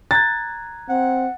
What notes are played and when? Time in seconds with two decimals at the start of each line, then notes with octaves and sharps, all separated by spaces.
0.11 A#5 F#6 G#6 A6
0.89 C4 F#5